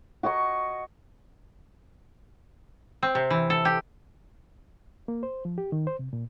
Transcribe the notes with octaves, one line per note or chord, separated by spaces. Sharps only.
F#4 D#5 G#5 C#6
C4
C3
E3
A4
G4
A#3
C5
F3
G4
D#3
C5
C3
A#2